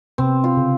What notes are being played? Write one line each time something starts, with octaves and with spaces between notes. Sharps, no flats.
C3 C4
F4
C#3